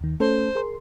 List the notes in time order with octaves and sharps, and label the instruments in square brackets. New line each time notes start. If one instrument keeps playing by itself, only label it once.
[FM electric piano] D#2 D#3
[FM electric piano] A3 C#4 A4 [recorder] C5
[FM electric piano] G#4 A#4 C6